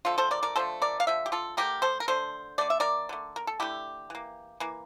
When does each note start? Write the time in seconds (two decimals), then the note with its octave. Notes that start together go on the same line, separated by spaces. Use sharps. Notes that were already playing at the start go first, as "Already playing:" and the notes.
0.05 D3 F3 A3 F4 A4
0.18 A4 C5
0.31 A#4 D5
0.43 A#4 D5
0.56 D3 F3 A3 A4 C5
0.82 A#4 D5
1.00 F5
1.07 D3 F3 E5
1.26 G4
1.32 F4 A4
1.57 D3 F3 A3 G4 A#4
1.82 A4 C5
2.00 A#4
2.08 D3 A3 A4 C5
2.58 D3 A3 D5
2.70 E5
2.80 A#4 D5
3.09 D3 A3
3.36 A#4
3.47 A4
3.60 D3 A3 E4 G4
4.10 E3 A#3
4.60 E3 A#3